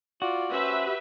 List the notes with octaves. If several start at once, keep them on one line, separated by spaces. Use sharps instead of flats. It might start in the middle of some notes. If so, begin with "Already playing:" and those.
F4 F#4 D5
C#4 G4 B4 C5 E5